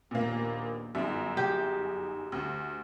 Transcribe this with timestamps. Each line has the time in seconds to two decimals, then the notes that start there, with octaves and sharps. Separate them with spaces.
0.11 A#1 D#2 A#2 A#3 B3
0.95 G1 F#2 D#4 G#4 E5
1.37 G4
2.32 D2